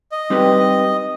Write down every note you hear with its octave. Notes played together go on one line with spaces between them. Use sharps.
D#5
G3 C4 D#4 G4 B4